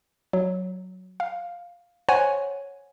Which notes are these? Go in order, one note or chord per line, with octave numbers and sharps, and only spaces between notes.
F#3
F5
C5 C#5 F#5 G#5